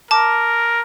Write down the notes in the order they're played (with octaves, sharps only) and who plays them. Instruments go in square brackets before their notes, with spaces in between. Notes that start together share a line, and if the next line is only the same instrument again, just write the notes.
[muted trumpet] A#4 [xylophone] A5 D6